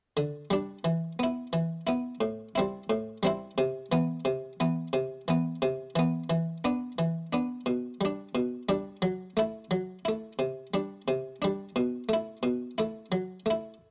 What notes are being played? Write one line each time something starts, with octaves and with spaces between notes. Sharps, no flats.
D3
G3 D4
E3
B3 E4
E3
B3 E4
A2
G3 C4 E4
A2
G3 C4 E4
C3
E3 B3
C3
E3 B3
C3
E3 B3
C3
E3 B3
E3
B3 D4
E3
B3 D4
B2
G3 D4
B2
G3 D4
F#3
A3 E4
F#3
A3 E4
C3
G3 D4
C3
G3 D4
B2
A3 E4
B2
A3 E4
F#3
A3 E4